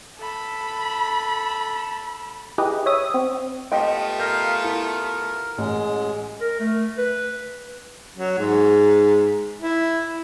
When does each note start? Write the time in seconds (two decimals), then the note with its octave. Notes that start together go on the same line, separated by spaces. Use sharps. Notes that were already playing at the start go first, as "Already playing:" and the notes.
0.19 A4 B5
2.58 E4 G4 G#4 B4 D#5
2.86 C#5 E5 D#6
3.14 C4
3.72 A3 B3 F4 G4 D#5 G5 C6
4.19 A#4 F5 G6 A#6
4.64 E4 A#4
5.58 A1 G#3
6.41 A#4
6.60 A3
6.98 B4
8.16 F#3
8.38 G#2
9.61 E4